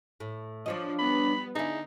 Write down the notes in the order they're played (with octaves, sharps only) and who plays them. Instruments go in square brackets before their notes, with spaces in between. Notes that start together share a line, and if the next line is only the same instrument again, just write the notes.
[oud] A2
[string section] F3 [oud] D4 C#5 D#5
[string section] G3 B3 [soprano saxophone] B5
[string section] D3 [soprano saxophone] D#4 [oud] E4 G#4